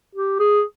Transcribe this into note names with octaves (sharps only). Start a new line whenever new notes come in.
G4
G#4